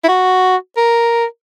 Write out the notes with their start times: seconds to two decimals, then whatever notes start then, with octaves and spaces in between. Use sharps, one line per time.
0.04 E4
0.08 F#4
0.77 A#4